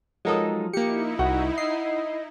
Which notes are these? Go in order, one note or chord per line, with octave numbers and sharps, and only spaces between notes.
F3 F#3 G#3 D#4 A4 A#4 D#6
A#3 D#4 E4 G4 C#7
C2 F#4 F#5
D#5 C7